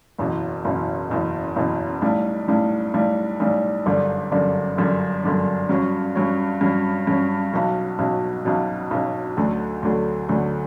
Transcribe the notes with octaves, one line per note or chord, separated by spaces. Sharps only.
F#1 E2 B2
F#1 E2 B2
F#1 E2 B2
F#1 E2 B2
B1 A2 G3
B1 A2 G3
B1 A2 G3
B1 A2 G3
G1 F#2 D3 G3 D4
G1 F#2 D3 G3 D4
G1 F#2 D3 G3 D4
G1 F#2 D3 G3 D4
G2 F#3 C#4
G2 F#3 C#4
G2 F#3 C#4
G2 F#3 C#4
B1 B2 F#3
B1 B2 F#3
B1 B2 F#3
B1 B2 F#3
D2 D3 F#3 A3
D2 D3 F#3 A3
D2 D3 F#3 A3